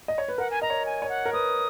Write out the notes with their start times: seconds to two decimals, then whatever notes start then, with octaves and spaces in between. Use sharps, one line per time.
0.08 D#5
0.18 C#5
0.28 B4
0.38 A#4 F#5
0.51 G#5
0.62 D#5 A#5
0.70 C#5
0.86 G#5
1.02 C#5
1.09 F#5
1.26 A#4
1.33 B4 D#6